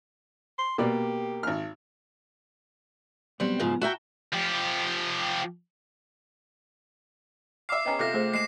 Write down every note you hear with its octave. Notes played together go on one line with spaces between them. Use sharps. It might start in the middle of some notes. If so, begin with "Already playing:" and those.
C6
B2 A#3 G4 D5
G#1 F6
B1 F#3 G3 B3 C4
G#2 C#3 F3
F#4 E5 G5 A5 A#5
F3 G4
E5 F5 D6 C7
B3 C#4 G#4 D#5 G5 A#5
C3 F4 A4 E5 D6 A#6
A3 G#4 C5
G#3 C7 E7